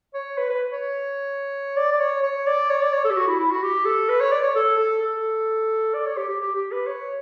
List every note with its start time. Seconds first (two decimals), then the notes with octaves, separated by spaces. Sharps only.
0.14 C#5
0.38 B4
0.49 B4
0.72 C#5
1.77 D5
1.92 D5
2.00 C#5
2.23 C#5
2.47 D5
2.69 C#5
2.82 D5
2.93 C#5
3.05 A4
3.11 G4
3.17 F#4
3.28 E4
3.39 E4
3.51 F#4
3.63 G4
3.85 A4
4.09 B4
4.20 C#5
4.31 D5
4.43 C#5
4.55 A4
4.78 A4
5.02 A4
5.94 D5
6.06 C#5
6.17 G4
6.29 G4
6.40 G4
6.56 G4
6.72 B4
6.87 C#5